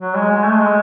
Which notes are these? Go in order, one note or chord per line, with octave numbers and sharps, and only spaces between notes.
F#3
G#3
G#3
A3
G#3